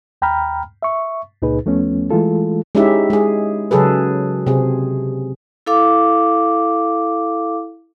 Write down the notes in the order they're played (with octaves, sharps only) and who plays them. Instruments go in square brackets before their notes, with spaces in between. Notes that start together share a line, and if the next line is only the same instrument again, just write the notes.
[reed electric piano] D#2 G5 A#5 B5 F6
E5 C#6
C#2 A#2 D#4 G#4 B4
D#2 F3 A3 B3 C#4
E3 G#3 A3 F4 A4
[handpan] G#3 C#4 D#4 E4 G4 E5
G#3 G#4
C#3 F#3 G#4 A4 B4
C3 C4 G#4
[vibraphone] E4 A4 F5 D6